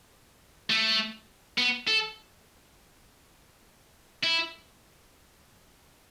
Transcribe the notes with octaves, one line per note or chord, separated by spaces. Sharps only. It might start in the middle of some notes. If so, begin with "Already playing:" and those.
A3
B3
A4
E4